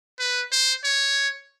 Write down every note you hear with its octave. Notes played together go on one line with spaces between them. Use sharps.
B4
C5
C#5